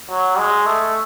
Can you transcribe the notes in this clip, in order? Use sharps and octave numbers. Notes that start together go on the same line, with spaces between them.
F#3
G#3
A3